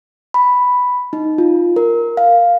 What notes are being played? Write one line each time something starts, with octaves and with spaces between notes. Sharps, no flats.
B5
D#4
F4
A#4
F5